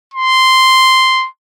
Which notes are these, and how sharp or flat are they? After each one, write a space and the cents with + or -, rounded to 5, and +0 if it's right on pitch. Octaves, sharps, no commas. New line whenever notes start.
C6 -5